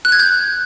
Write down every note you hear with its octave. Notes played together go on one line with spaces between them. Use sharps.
F#6
G#6
G6